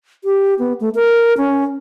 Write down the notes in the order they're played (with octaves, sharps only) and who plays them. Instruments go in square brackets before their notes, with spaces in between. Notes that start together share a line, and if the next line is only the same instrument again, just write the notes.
[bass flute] G4
B3
A3
A#4
C#4